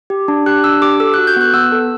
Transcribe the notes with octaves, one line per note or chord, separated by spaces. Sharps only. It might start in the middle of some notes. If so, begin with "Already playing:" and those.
G4
D4
G4 F#6
D4 E6
G4 D6
A4 E6
F#4 F#6
G6
B3 F#6
B3 E6
A4